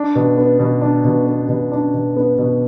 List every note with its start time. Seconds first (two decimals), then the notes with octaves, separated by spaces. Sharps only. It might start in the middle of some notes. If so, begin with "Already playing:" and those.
Already playing: D4
0.15 B2
0.38 B3
0.59 B2
0.82 D4
1.04 B2
1.26 B3
1.49 B2
1.72 D4
1.94 B2
2.17 B3
2.38 B2